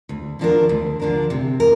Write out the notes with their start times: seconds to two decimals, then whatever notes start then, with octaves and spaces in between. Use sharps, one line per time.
0.09 D2
0.39 D3 F3 D4 A#4
0.69 D2
1.00 D3 F3 D4 A#4
1.30 C3
1.60 A#4